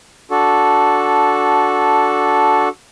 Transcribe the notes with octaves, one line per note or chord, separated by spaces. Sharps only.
D4 F#4 A4